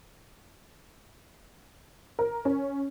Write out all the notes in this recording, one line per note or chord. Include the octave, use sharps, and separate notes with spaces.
A#4
C#4